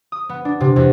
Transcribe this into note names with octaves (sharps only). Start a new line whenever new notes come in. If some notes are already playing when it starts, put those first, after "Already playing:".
D#6
B3
D4
C3
E2